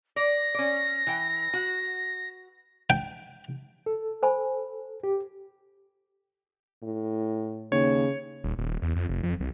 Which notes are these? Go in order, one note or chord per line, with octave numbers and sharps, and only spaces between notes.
D5 A#6
C#4 D5
E3 G5
F#4
G5
A4
C5 G#5 B5
G4
A2
D#2 C#3 C#5
D#1
D#1
E2
F2
F1
F2
C2